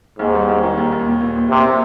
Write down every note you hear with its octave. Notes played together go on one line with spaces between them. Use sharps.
D#2 G#2
G3
D#2
D#3
D#2
D#2
A#2
A#2
A#1
A#1 C3
A#2